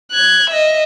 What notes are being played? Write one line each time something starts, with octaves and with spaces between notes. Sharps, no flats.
F#6 G#6
D#5 E5